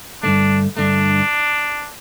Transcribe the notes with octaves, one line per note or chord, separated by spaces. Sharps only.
G2 D3 A3 D4
G2 D3 A3 D4